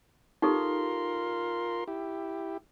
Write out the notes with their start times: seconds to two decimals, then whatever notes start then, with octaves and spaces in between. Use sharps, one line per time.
0.42 D#4 F4 G4 A4 A#4 C6
1.88 E4 G4